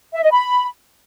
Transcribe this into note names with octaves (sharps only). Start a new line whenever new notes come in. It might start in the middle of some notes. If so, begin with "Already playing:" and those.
E5
D#5
B5